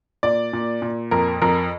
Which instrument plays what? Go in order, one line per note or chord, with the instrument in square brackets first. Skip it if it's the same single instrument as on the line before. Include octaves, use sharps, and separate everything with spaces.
[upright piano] A#2 D5
A#2
A#2
F2 A#4
F2 A#4